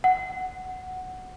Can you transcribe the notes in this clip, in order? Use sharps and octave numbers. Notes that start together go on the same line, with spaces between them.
F#5